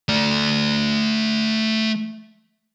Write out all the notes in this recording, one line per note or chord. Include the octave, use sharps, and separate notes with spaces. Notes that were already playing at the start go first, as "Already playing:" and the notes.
A3 D5